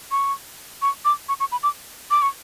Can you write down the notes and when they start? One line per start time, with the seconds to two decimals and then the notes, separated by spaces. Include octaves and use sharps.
0.11 C#6
0.82 C#6
1.05 D6
1.29 C#6
1.40 C#6
1.52 B5
1.63 D6
2.11 D6
2.22 C#6